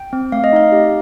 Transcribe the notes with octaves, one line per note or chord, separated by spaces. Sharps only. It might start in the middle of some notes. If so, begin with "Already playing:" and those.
Already playing: G5
C4
A3 F5
D#5
D#4 F5
G4